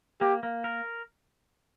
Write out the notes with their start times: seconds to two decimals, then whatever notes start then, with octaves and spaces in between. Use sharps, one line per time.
0.21 A#3 G4
0.43 A#3
0.64 A#4